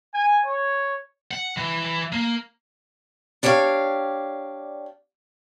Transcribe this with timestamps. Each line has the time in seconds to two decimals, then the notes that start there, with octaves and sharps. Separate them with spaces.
0.14 G#5
0.46 C#5
1.31 F#5
1.57 E3
2.13 A#3
3.43 D4 G4 C#5 D5 F5